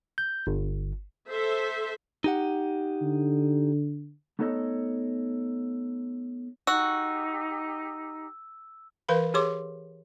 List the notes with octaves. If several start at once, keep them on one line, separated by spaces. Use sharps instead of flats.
G6
G1
A4 C5 E5
D#4 G4 F#5
D3
A3 B3 D#4 A4 C#5 D#5
D#4 F#4 G4 E6
E3 A#4 B4 F5 B5
G4 G#4 C#5 C6 D6